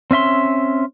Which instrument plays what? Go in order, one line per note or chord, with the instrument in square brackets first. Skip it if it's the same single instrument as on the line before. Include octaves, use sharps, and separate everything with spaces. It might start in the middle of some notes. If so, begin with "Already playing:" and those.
[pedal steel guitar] C4 C#4 E5 C6